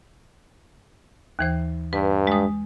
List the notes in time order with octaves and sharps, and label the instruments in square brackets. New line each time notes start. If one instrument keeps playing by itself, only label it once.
[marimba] D#2 E3 C5
[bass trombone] G2 [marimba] B4
[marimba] G#3 D#6